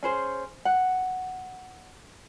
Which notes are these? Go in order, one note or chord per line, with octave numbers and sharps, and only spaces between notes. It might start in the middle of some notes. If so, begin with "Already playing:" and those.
C#4 G#4 C5
F#5